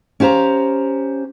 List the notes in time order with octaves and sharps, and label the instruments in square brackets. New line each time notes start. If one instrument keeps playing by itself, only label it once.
[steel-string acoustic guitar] C#4 G4 C5 F5 A#5